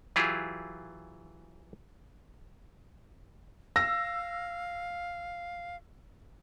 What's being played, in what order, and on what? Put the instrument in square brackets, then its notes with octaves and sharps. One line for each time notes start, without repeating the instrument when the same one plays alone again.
[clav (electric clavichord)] E3 F#3 E4 F4 G4 G#4
[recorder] F5 [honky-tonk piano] E6 [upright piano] A#6